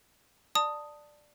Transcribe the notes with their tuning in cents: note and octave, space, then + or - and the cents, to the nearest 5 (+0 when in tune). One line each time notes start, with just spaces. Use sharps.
D5 +10 A5 +15 D#6 +0